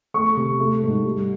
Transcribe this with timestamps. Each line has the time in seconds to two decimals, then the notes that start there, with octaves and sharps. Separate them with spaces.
0.14 A3 C#6
0.36 C3
0.60 A3
0.83 G#2
1.05 G3